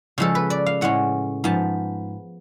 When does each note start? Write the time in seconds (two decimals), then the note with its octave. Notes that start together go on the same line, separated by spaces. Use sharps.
0.18 C#3 F3 G#3 A4
0.35 B4
0.50 D5
0.66 F5
0.81 A2 G#3 C#4 F#5
1.44 G#2 F3 B3 A5